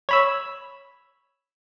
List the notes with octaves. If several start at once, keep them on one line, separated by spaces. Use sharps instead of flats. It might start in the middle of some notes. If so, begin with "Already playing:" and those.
C#5 B5 E6